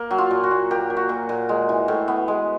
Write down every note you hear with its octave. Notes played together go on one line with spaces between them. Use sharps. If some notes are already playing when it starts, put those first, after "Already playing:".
Already playing: A#3
F#3
F4
A#2
F#4
A#2
A#3 G4
F#3
F#4
A#2
A#2
G#3
E3
A2
B3
G#3